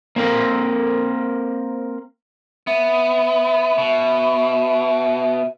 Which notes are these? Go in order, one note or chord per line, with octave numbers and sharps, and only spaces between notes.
A#3 C4 A#4 C5
B3 E5
B2